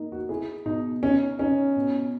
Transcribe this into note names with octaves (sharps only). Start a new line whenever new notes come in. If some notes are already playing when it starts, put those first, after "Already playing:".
Already playing: A#3 D#4
F#4
E4 G#4
B2 D#4
C#4 D#4
C#4 D#4
B2